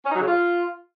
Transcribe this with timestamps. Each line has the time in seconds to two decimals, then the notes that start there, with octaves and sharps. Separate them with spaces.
0.04 C#4
0.10 D#4
0.15 F#3
0.21 C#3
0.26 F4